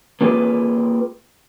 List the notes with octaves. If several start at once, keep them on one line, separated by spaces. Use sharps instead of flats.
A#3 F4 G4 G#4 B4